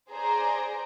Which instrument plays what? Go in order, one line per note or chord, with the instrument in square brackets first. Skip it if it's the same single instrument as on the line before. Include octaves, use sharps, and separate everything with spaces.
[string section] G#4 C5 D5 A#5